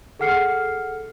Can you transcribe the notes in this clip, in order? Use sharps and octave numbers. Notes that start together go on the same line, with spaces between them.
G#4 A4 F#5 F6 C7 C#7